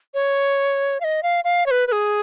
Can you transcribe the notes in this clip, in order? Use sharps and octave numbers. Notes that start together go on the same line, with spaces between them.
C#5
F5
D#5
F5
F5
C#5
B4
B4
G#4